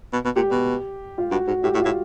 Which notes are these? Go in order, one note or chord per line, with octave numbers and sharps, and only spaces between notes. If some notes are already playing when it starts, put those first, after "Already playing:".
B2
B2
A#2 G4
B2
F4
G2 F#4
G#2 F#4
A2 G4
A2
F4
A2